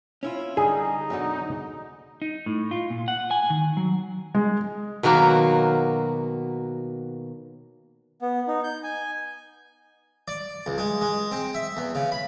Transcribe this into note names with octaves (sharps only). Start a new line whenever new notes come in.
C#4 E4 F4
D3 G3 D#4 G#4
F#2 B2 D3
D#4
A2
F4
A#2
F#5
G#5
D#3
F#3
G#3
B2 D#3 F#3 A#3 B3
B3
D#4
G6
G#5
D5
C#2
G#3
G#3
C4
E5
E2
C#3
B5